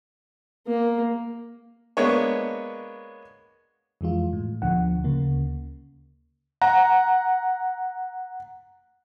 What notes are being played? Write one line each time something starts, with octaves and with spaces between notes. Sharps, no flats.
A#3
G#3 A#3 B3 D4 C#5
F2 E3 G#3 F4
A2
D2 B2 D3 F3 F#5
D2 C#3 A#3
F#5 A#5